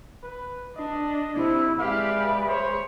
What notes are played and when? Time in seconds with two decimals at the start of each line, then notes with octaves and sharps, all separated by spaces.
0.23 B4
0.77 D4 D#5
1.36 C3 E4
1.79 G#3 G4 B4 D5 E5 F5
2.48 C5 C#5